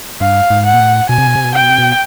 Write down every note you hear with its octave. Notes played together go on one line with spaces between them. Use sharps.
G2 F5
G#2
F#5
A#2
A2
B2 G#5
C3
B2
C3
B2
C3 G5
B2
C3
B2